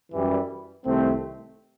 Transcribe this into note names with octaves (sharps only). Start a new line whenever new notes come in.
F#2 E3 G3
C2 C3 D#3 A3 C4